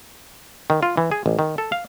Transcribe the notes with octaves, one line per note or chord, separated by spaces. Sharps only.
D#3
F4
E3
G#4
A1
D#3
A4
F5